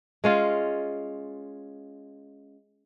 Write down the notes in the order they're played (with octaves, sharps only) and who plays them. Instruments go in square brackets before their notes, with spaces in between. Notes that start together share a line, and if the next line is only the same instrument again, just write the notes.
[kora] G#3 C#4 F4